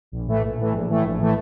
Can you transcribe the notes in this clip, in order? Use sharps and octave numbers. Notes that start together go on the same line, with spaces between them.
A#1
A2 E3 A3
A#1
A2 E3 A3
A#1
A2 E3 A3
A#1
A2 E3 A3